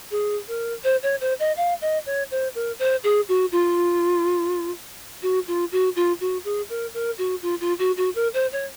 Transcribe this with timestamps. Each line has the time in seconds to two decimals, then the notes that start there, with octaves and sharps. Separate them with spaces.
0.11 G#4
0.48 A#4
0.84 C5
1.03 C#5
1.21 C5
1.39 D#5
1.57 F5
1.81 D#5
2.06 C#5
2.31 C5
2.55 A#4
2.79 C5
3.03 G#4
3.28 F#4
3.52 F4
5.22 F#4
5.48 F4
5.72 F#4
5.96 F4
6.20 F#4
6.44 G#4
6.69 A#4
6.94 A#4
7.18 F#4
7.42 F4
7.61 F4
7.79 F#4
7.97 F#4
8.15 A#4
8.34 C5
8.52 C#5